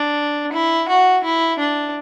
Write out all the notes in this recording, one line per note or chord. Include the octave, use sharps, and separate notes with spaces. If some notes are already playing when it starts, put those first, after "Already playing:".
Already playing: D4
E4
F#4
E4
D4